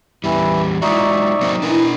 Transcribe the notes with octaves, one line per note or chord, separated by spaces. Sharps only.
E2 E3 G3 E4
G#3 D#4 F4 F#4 D5 E5 A#5 C#6
F#3 A#3 C4
E3 D4 E4 A#4